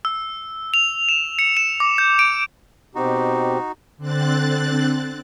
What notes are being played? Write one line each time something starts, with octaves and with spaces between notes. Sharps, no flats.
E6
F7
E7
C#7
E7
D6
G6
D7
B2 C4 D#4 F#4 G4
D3 C4 F#6 A6